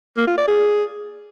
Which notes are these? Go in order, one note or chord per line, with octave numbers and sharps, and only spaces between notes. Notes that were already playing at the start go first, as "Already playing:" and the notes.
A#3
F4
D5
G#4